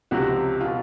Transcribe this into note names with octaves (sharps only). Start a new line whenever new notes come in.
C#2 C3 F3 F#4
B2 F4